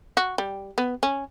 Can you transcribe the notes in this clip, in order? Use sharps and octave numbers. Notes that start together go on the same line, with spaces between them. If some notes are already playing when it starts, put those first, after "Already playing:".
F#4
G3
B3
C#4